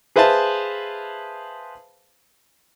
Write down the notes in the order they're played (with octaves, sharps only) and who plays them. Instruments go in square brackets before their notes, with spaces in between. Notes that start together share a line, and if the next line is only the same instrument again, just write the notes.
[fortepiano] G#4 B4 C5 E5 F5 A5